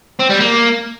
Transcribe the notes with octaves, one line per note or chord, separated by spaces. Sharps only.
C4
G3
A#3